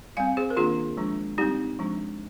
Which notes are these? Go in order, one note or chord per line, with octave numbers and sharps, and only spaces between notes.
G3 C4 F5 G#5
G#4 C5
A#4
D#3 A#3 D4 F4 G#4
F3 G#3 D4
G3 C4 D#4 G4
F3 G#3 D4